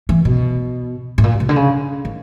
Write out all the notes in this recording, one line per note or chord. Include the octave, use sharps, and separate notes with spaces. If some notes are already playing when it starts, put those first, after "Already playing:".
E3
B2
A2
A#2
C3
D3
C#3
D#3